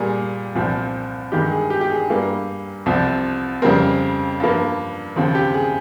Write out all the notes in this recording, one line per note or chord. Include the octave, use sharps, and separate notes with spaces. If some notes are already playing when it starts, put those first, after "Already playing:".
Already playing: A#2 G3 A#3 G#4
C2 A#2 F3 C4
G2 D#3 G#3 G4
G#4
G4
G4
G#4
G2 G3 A#3
C2 C3 F3 C4
F2 C#3 G3 C4 A#4
G2 F3 A#3
D#2 C#3 F3 C4
G4
G#4